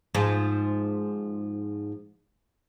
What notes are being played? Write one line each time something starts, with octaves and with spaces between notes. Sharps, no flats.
G#2 F3